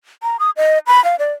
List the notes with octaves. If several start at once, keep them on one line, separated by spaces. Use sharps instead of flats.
A#5
D#6
D#5
B5
F5
D5